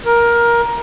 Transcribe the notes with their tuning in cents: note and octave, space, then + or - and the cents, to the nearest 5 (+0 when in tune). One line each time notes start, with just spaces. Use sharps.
A#4 +15